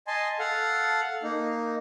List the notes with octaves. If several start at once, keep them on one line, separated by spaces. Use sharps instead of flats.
D#5 G#5 A5 C6
A4 F5 F#5
A#3 D#4